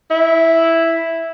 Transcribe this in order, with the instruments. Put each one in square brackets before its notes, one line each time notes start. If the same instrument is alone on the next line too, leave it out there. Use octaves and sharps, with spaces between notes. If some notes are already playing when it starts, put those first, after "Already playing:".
[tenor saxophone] E4